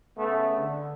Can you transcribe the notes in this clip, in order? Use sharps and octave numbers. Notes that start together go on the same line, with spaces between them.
C#3 A3 B3
D3